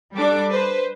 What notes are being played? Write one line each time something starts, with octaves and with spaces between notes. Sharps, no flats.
G3 D4 A4 D6
B4 C5